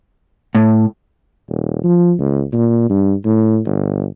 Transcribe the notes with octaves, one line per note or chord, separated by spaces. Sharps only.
A2
D#1
F3
C#2
A#2
G2
A2
G1